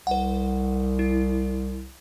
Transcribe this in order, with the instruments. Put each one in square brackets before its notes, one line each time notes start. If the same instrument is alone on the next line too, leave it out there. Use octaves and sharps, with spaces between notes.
[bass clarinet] C2 [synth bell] B4 F#5
[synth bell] E4